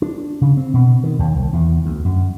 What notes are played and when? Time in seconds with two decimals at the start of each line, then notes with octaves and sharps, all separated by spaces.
0.02 D4
0.41 C#3
0.57 C4
0.74 B2
1.04 D#3
1.19 D#2
1.36 C2
1.53 E2
1.86 D2
2.05 F#2